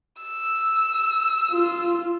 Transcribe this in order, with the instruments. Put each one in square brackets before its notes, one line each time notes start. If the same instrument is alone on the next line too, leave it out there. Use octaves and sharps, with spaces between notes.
[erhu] E6
[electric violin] F4